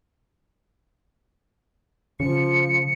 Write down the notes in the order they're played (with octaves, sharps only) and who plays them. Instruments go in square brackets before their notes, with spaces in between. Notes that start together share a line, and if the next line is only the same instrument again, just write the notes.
[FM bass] C#3 [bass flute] F3 [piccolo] C#7